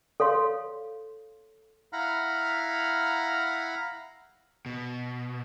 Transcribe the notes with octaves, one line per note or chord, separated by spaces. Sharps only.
A4 C#5 F5 C6
E4 F5 F#5 A#5 B5 F6
B2